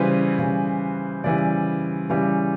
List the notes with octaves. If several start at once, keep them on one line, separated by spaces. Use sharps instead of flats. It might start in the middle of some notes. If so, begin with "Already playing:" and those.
Already playing: C#3 E3 G3 B4 C5
C#3 E3 G3
C#3 E3 G3 D5
C#3 E3 G3